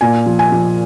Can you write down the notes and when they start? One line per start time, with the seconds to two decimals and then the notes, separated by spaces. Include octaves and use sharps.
0.01 A#2 G#5
0.26 F3
0.39 G#5
0.52 F3